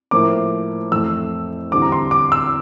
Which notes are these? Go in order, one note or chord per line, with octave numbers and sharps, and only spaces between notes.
A2 F3 A#3 D6
F2 E3 A3 E6
E2 D3 G3 C4 D6
A#5
C6
D6
E6